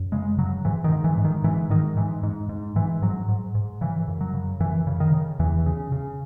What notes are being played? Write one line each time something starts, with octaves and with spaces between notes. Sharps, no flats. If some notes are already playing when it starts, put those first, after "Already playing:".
Already playing: F#2
C#3 G#3
C#3 F#3
G#2 E3
D#3
G#2
E3
G#2
D#3
G#2 E3
G#2 D#3
G#2 E3
G#2
G#2
G#2 E3
G#2 F#3
G#2
G#2
C#3 E3
F#2
F#3
C#3
F#2 E3
C#3
D#3
C#3
E2 E3
C#3
C#3